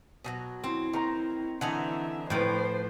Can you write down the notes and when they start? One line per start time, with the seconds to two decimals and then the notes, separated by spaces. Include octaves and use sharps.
0.24 B2 D#3 F#3
0.64 C4 E4
0.93 D#3 A#5 C6 C#6
1.61 D3 E3 D4 D#4 E5 F#5 G#5
2.30 A2 F3 B4 C5 G5